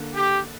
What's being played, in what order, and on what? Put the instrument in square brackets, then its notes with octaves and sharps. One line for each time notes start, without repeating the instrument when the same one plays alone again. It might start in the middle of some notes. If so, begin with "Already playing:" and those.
Already playing: [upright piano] D3 A#3
[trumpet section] G4